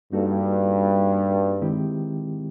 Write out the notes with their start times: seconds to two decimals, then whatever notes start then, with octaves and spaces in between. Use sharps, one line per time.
0.12 G2 G3 A#3 D#4 F#4 A4
1.61 D#3 G#3 C4 E4 G4